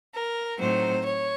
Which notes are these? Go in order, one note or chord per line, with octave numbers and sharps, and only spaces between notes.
A#4
A2 F#3 C4 D#4 C5
C#5